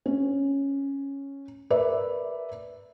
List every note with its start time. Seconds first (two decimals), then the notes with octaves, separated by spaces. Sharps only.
0.06 C#4
1.70 A#4 B4 D5 E5